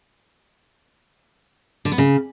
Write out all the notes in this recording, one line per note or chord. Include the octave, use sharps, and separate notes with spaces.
D3
B3
C#3